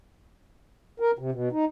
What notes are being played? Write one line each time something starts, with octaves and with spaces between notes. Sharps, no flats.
A#4
C3
B2
D#4